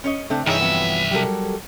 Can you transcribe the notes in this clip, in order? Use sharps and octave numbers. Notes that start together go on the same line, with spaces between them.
C#4 C#5 D#5
C#3 A3 C4 D4
C2 G2 E3 D#4 G#4 C#5 E5 G5
F2 F#3 B3
F#3 G3 G4 A4 A#4